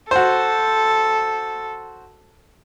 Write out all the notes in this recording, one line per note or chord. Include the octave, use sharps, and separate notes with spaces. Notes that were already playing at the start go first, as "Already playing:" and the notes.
F#4 A4 C5